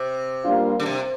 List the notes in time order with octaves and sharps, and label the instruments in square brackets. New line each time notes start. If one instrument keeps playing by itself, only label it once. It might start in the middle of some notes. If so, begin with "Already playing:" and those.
Already playing: [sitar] C3
[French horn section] G3 A#3 D4 F4
[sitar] D3
C3